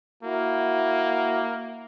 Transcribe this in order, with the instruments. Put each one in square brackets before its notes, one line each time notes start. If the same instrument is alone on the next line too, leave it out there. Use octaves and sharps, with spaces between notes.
[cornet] A#3 [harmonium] E4 F#4